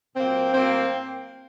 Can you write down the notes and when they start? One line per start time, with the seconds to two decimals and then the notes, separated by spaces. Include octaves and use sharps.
0.15 A#2 F#3 A#3 C4
0.54 A2 F#3 A#3 C4